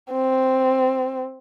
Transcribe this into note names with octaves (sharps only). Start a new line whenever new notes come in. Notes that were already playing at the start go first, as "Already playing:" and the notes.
C4